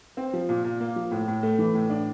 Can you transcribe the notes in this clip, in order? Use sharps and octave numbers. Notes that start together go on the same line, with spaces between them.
C4
F3
A#2
A#2
A#3
F3
A2
A2
A3
E3
A2
D4